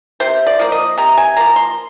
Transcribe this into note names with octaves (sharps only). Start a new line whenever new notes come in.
C3 C5
D5
F3 A#3
D#5
C3 A#5
G#5
F3 A#3 A#5
C6